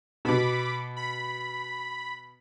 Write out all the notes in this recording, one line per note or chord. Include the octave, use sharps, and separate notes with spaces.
B2 B5 D6
B5